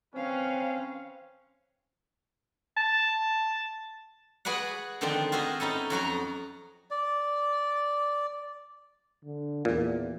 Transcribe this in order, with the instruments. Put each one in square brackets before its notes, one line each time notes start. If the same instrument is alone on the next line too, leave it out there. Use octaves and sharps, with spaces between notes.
[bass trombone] C4 [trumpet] C#4 [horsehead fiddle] B4 F5
[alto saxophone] A5
[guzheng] F#4 G#4 B4 D5 F#5
D3 D#3 F3 C4 D4
F4 F#4 G#4 C5 D#5 E5
C#4 D#4 E4 A4
F2 F#3 F#4 A#5
[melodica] D5
[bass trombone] D3
[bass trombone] E2 [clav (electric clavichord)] A#2